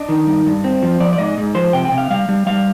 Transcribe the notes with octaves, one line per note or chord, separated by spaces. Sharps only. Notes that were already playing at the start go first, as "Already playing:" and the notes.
Already playing: D4 D#5
D#3
G2
G2
C4
F3
F3 D5
D5
G#2 D#5
G#2
F3 C5
C3 G5
G5
C3
F5
G3 F5
G3
G3 F5